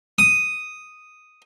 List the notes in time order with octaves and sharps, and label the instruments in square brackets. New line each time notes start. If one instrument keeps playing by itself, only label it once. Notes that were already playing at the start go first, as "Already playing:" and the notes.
[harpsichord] D#6